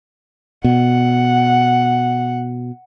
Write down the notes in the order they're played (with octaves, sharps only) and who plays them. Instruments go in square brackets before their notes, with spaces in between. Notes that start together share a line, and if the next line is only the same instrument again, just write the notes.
[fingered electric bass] B2 [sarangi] F#5